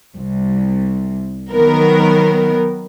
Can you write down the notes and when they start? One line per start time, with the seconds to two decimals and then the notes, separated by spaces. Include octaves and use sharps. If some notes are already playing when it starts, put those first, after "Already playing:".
0.15 C2
1.51 D#3 F#3 B3 A#4